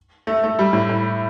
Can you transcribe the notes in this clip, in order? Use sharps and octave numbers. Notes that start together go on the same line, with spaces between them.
A3
A3
G3
A2
A2